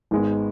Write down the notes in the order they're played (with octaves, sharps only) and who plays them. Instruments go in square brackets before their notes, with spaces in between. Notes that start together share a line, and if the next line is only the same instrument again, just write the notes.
[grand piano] G#1 G#2 G#3 B3